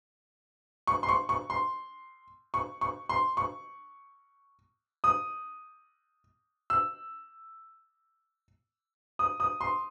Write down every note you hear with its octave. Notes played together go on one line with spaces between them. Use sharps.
C#6
C6
C#6
C#6
C6
C#6
C#6
C6
C#6
D#6
E6
D#6
D#6
C6